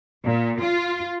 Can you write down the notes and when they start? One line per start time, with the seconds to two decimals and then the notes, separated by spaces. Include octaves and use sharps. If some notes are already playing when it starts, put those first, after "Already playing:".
0.24 A#2
0.62 F4